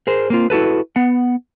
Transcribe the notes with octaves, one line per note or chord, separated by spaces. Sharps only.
G#4 A#4 C5
A#3 C4 F4
E4 F#4 A4 B4
B3 F#5